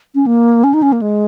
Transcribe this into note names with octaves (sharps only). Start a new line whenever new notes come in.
C#4
A#3
C#4
D#4
C#4
A#3
G#3